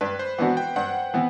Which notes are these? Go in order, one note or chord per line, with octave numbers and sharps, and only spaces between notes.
G2 B4
C5
E3 B3 D4 F#4 F#5
G5
G2 F#5
E3 B3